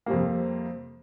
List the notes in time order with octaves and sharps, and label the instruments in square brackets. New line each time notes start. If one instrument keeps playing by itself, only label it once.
[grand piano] F2 C3 G3 A#3